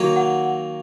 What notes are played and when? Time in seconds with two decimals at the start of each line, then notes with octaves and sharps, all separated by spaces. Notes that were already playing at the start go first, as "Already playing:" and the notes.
Already playing: D#3 F#3 A#3
0.16 F#5